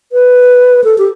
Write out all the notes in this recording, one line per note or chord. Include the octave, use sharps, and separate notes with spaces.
B4
A4
G4